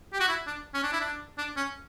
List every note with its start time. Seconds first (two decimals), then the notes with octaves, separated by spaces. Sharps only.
0.13 G4
0.20 F#4
0.28 E4
0.46 D4
0.74 C#4
0.83 D4
0.92 E4
1.00 D4
1.38 D4
1.56 C#4